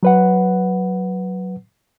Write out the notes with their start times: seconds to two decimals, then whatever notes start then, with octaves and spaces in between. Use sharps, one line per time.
0.03 F#3 B4 F#5